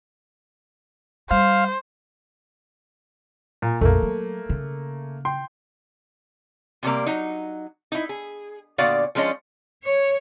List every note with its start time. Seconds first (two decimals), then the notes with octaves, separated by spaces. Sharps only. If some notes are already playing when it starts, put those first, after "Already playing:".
1.31 G3 C5 F5
3.62 A#2
3.81 A#1 F2 A3 A#3
4.02 F#3
4.49 C#3
5.25 G5 C6
6.83 C3 F#3 G3 A#3
7.06 F#3 D#4
7.92 D#4 E4
8.09 G#4
8.78 A#2 D3 B3 F#4 D5 F5
9.15 F3 G#3 C#4 D4 D#5
9.83 C#5